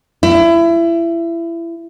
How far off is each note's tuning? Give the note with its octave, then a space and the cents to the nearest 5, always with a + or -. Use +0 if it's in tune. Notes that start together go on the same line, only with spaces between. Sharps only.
E4 +25